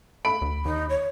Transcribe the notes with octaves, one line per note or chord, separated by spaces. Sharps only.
A3 B5 D7
D2
D#2 D#4
C#5